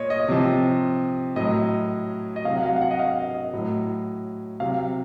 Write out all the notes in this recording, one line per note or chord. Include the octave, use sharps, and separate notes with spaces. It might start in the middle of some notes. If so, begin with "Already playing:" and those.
Already playing: A#2 C#5 D#5
D#5
C3 F3
A2 F#3 D#5
D#5
C3 F#3 F5
F#5
F5
F5
F#5
D#5
F5
D#5
A2 F#3
C3 F#3 F5